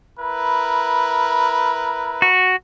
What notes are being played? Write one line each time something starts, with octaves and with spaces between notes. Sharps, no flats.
E4 A#4 B4
F#4